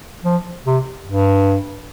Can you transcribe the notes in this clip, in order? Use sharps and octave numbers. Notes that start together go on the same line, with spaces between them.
F3
C3
G2